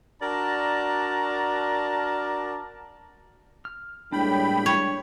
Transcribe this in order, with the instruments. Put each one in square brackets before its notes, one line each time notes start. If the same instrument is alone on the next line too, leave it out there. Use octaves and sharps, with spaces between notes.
[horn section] D4 F#4 A#4 D5 A5 A#5
[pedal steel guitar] F6
[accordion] A2 G5 B5 [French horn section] G3 G#3 A#3 [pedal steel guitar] D4
[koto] C#5